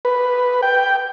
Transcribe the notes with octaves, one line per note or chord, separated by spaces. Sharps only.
B4
G5